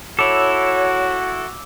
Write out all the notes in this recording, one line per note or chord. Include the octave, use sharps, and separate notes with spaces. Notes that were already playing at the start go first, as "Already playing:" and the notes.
E4 F#4 A4 C#5 D6 E6 F7